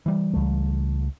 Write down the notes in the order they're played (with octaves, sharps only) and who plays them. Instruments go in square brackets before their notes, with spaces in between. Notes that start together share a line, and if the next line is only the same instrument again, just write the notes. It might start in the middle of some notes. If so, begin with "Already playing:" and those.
[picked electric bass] E3 G3
[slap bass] C#2 A3